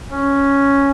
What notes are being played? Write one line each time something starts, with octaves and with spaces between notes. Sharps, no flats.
C#4